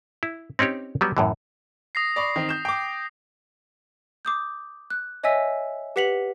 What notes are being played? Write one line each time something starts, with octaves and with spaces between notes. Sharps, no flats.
E4
C4 C#4 D#4 G4 C#5
F#3 G3 B3
F#2 A2 E3
D#6 A#6 C7
D5 B5 C#6
D#3 C4
G6 E7
G5 D6
D6 D#6 G6
F#6
C#5 D#5 E5 G#5 E6 B6
G4 B4 F#5 B6 F7 F#7